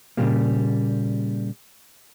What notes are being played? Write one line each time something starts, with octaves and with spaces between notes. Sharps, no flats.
A#2 C#3 E3 F3 G3 A#3